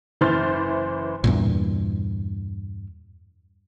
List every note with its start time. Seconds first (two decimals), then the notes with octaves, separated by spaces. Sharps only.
0.21 F#1 E3 C5 F6 A6
1.24 E2 G2 A#2